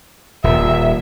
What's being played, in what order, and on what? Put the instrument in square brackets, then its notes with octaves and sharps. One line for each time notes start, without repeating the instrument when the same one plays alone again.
[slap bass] D#1 [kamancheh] E5